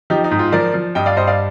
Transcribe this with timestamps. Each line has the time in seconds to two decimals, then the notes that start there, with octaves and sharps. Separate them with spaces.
0.10 F3 D#4 G4
0.24 D#4
0.31 G#2
0.39 F4
0.52 F3 A#4 D5
0.74 F3
0.95 G2 D#5 G5
1.06 D5 F5
1.17 G2 C5 D#5
1.27 D5 F5